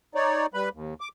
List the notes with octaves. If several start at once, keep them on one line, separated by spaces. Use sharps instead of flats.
D#4 C#5 D5
G3 B4 B5
D#2
D6